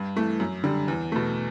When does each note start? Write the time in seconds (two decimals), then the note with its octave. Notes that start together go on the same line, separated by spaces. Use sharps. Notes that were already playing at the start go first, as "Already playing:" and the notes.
Already playing: G2
0.16 E3 A3
0.40 F#2
0.64 D3 G3
0.88 E2
1.12 B2 A3